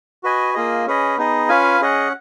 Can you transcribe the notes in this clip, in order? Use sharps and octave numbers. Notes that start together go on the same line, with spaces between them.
F#4 B4 D#5 G#5
A#3 F4 G#4 D#5
C#4 G#4 B4 D#5
B3 D#4 G#4 D#5
C#4 F4 B4 F5 G#5
C#4 G#4 D#5 F#5